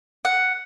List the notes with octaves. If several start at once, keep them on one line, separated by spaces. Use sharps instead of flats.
F#5